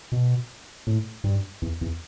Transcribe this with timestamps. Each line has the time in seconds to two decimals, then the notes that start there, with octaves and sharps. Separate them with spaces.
0.12 B2
0.87 A2
1.24 G2
1.62 E2
1.81 E2